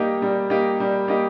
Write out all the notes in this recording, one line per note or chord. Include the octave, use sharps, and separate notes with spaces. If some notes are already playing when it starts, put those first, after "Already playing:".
Already playing: G3 A#3 D#4 G4
G3
A#3 D#4 G4
G3
A#3 D#4 G4